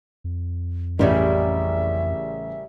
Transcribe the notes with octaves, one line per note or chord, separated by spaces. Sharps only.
F2
A1 C#3 G3 A#4 E5